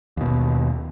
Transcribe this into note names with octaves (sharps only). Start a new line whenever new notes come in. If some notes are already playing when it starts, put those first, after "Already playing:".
D#2 B2